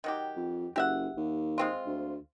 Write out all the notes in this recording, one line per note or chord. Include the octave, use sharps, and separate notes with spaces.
D#3 F#3 G4
F2
F#1 G4 E5 F#5
D#2
G#3 C4 F4
D2